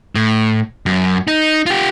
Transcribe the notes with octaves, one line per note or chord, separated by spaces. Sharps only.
A2
F#2
D#4
F4 G4